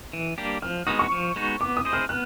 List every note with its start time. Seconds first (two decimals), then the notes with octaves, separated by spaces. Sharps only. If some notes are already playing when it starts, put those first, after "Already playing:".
0.13 E3
0.38 G3 A#3 D4 G4
0.62 F3 F6
0.87 G#3 B3 D#4 F#4 D#6
0.99 C#6
1.12 F3
1.36 G#3 B3 D#4 F#4
1.60 B3 D6
1.77 D#6
1.85 E4 G#4 C5 D#5
1.93 F6
2.09 B3 F#6